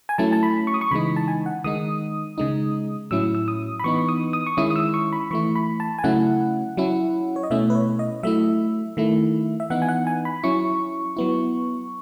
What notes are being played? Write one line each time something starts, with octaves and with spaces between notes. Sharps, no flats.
G#5
F#3 A3 C#4 E4 A5
A5
B5
C#6
D#6
C#6
C#3 E3 G#3 D#4 B5
A5
G#5
F#5
D#3 G#3 D#4 D#6
C#3 G#3 D#4
A2 F#3 C#4 E4 E6
E6
D#6
B5
E3 B3 D#4 C#6
C#6
D#6
D#6
C#6
D#3 G#3 C#4 E4 D#6
D#6
E6
C#6
B5
E3 A3 E4 C#6
B5
A5
G#5
C#3 F#3 A3 C#4 E4 F#5
F#3 C#4 E4
C#5
D#5
B2 A3 C#4 E4 E5
B4
C#5
D#5
F#3 A3 E4 E5
D#3 A3 E4
E5
E3 B3 D#4 F#5
G#5
F#5
G#5
B5
F#3 C#4 E4 C#6
F#3 B3 E4